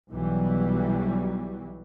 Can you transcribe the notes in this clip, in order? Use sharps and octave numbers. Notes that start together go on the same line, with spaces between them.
B1 E3 F#3 G3